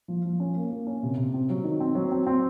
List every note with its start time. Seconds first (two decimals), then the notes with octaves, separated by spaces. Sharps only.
0.08 F3
0.25 F3
0.40 C#4
0.56 A#3
0.72 A#3
0.87 C#4
1.03 C3
1.17 C3
1.34 C4
1.50 F#3
1.64 D#3
1.80 C4
1.95 F#3
2.12 C4
2.27 C4